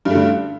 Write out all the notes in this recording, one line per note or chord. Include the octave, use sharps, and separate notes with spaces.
G2 D3 A3